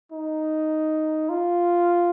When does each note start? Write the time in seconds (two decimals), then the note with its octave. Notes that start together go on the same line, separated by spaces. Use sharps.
0.12 D#4
1.29 F4